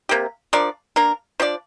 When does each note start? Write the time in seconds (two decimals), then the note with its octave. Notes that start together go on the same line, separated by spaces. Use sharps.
0.09 C3 A#3 G4
0.53 F3 D4 A#4 D5
0.96 A#3 D4 A#4
1.40 F3 D4 G4 D5